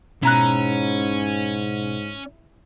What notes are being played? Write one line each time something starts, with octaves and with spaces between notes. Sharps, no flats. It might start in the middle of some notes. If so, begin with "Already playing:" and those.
G#2 B2 C#4 E4 A#5 F#6